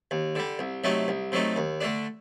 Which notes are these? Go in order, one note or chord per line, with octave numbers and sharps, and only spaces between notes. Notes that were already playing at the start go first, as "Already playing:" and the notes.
D#2
D3 G3
C2
C3 F#3 A3 D#4
C2
C3 F#3 A3 D#4
D#2
D3 A3 D4